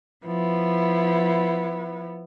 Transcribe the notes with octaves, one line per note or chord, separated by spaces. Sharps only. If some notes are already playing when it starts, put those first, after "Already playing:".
F3 B3 E4